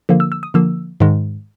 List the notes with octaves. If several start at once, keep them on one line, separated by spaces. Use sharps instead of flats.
D3 F3 A#3
E6
E6
D#6
D3 F3 A#3 E6
G#2 D#3 G#3